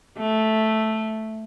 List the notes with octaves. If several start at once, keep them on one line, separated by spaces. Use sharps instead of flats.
A3